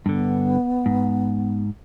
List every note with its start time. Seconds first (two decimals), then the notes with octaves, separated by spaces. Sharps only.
0.06 G2 D3 B3
0.86 G#2